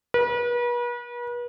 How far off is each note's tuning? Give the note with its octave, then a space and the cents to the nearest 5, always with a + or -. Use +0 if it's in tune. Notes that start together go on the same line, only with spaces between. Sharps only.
B4 -40